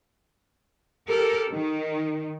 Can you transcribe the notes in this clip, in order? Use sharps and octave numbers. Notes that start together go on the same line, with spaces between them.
G4 A4 A#4
D#3